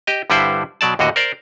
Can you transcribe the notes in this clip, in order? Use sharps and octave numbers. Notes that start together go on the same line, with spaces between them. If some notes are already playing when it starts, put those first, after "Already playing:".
G4 D#5
G2 D3 G3 E4 B4 C5
B2 F#3 D5 A5
D#2 A2 D3 F#4 D#5
A#4 C5 D5